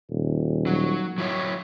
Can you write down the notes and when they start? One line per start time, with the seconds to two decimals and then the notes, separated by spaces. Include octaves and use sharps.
0.10 D#1
0.67 F#3
1.18 F#3 E4 C#5